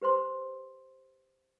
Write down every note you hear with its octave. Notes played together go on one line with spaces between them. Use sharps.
G4 B4 C5 C6